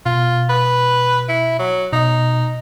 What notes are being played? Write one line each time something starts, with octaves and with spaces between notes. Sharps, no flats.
B2 F4
B4
E4
F#3
B2 D#4 D#5